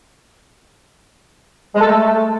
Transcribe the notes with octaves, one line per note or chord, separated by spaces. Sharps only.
G#3
A4
A3